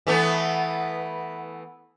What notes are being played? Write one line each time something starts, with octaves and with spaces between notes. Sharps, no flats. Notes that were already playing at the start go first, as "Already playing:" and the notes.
E3 A3 B3